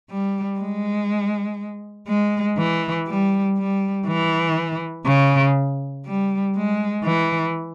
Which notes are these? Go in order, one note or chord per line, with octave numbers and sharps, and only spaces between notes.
G3
G#3
G#3
E3
G3
G3
E3
C#3
G3
G#3
E3